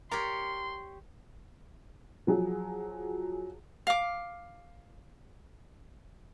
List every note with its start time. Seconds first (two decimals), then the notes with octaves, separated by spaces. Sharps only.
0.11 G4 A#4 C#5 D5 C6
2.27 F3 F#3 G#4
3.87 F5 D6